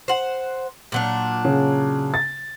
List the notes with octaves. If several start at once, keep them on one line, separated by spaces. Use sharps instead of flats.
C5 F#5
A#2 F#3 D4
C#3
A6